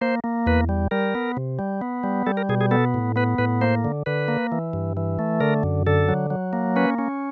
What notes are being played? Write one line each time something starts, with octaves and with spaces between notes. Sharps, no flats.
A#3 C5
A#3
E2 B4
G3
G3 A#4
B3
C3
G3
B3
G3
G3 A4
A#4
B2 G#4
G#4
B3 A4
A2
B3 B4
A2 B4
A#3 C5
D3
D3 B4
A#3
E3
G2
E3
A3
D3 A#4
F#2
D3 A4
F#3
F#3
A#3
C#4 B4
C#4